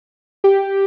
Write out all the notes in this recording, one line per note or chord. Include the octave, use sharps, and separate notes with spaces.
G4